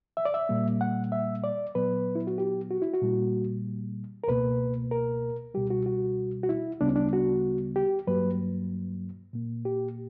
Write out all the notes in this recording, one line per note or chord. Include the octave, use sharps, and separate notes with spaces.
E5
D5
E5
A#2 G3 A#3
F#5
E5
D5
A#2 F#3 B3 B4
E4
F#4
G4
F#4
E4
F#4
A#2 G3 A#3
A#4
C#2 B2 A#3 B4
A#4
C#2 B2 G3 G4
F#4
F#4
F#4
E4
D2 C#3 G3 B3 D4
C#4
D4
F#4
G4
G2 F#3 A#3 B4
A#2 A#3
G4